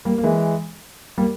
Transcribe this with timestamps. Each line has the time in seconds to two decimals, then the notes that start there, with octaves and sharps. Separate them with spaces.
0.05 G3 A#3
0.18 A#3
0.24 E3 G#3
1.18 G3 A#3